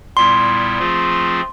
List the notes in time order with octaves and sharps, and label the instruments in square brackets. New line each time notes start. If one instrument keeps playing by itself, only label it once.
[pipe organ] A#2 G3 B3 E4 [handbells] C6
[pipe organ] F3 A3 C4 F4 G#4